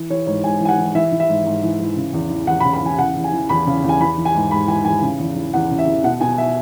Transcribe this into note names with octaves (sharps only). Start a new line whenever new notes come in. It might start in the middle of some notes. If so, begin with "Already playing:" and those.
Already playing: E3
E3 C#5
G#2 C#5
G#2 G#5
E3 G#5
F#5
E3
E3 E5
E3
E5
G#2
G#2
E3
E3
C#3
E2
E3
E2 F#5
B5
C#3
B5
E2 G#5
C#3 F#5
E2
G#5
E3
E2 B5
C#3
E2
G#5
E3 B5
E3
G#5
G#2
G#2 B5
E3 G#5
E3 G#5
C#3
E2
E3
E2 F#5
C#3
E5
E2
B2 F#5
B2 G#5
E5